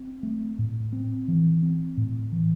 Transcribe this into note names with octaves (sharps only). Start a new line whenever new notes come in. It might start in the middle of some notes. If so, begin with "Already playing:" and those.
Already playing: C4
A3
A2
C4
E3
C4
A2
E3